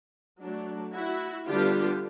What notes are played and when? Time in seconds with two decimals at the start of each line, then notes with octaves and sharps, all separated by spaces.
0.42 F#3 A3 D4
0.94 E4 F#4
1.47 D3 G3 B3 D4 F4 G4